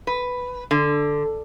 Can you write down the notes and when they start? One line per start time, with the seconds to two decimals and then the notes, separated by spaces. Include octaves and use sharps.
0.07 B4
0.71 D3